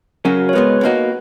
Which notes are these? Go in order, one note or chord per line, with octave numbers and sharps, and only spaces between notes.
C#3 F#3 C#4 F#4 A#4
C#5
C#2 B2 G#3 B3 B4
B2 A#3 D#4 F#4